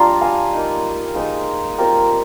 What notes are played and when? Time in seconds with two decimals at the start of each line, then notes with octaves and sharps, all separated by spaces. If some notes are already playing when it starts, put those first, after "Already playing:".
Already playing: G3 D4 F4 A#5 C6
0.21 F5 G#5
0.53 A#3 D#4
1.15 A#3 D#4 G#4 C5
1.78 G3 C4 F4 G4 A#4